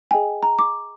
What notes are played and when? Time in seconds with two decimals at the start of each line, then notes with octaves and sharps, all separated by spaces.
0.11 G#4 D#5 G5 G#5
0.43 A#5
0.59 D6